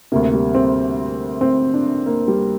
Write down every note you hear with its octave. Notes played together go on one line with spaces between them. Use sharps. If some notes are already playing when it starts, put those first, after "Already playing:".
D2 C3 A#3
G3
C4
C4
D4
A#3
G3